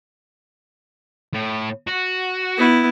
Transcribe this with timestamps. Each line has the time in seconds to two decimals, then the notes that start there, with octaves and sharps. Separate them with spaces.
1.34 A2
1.87 F#4
2.57 B3 E4